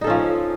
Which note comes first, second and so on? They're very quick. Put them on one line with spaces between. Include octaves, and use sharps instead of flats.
D#4 A4 C#4 F3